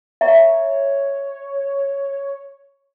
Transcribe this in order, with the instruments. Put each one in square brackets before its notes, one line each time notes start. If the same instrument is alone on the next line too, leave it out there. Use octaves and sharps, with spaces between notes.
[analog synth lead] C#5 [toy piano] E5 A#5